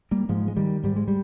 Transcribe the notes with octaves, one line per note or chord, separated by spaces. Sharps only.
G3 A#3
G#2 F3 G#3
G#3
D#3 G3
G#2 G3
G#3
G3